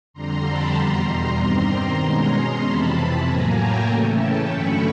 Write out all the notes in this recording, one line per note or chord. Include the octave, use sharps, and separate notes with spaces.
F2 D3 G3 A#5 C6
A5 B5
E2 B2 G3 A#5 C6
G2 D#3 G3 C4 A#5 C6
B2 G#3 C#4
F2 C3 E3 A5 B5
A2 F#3 A#3 G#5 A#5
G5 A5
C#3 E3 A3 C#4
G5 A5
G2 D3 F#3 A3 C#4 B5 C#6